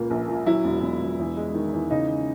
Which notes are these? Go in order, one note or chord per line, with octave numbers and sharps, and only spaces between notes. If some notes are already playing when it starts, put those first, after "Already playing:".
Already playing: C#2 A#2 A#3
A#1
A#2
F#3 E4
E1
E1
E1
E2
G#3
D#3
E2
C#3 D#4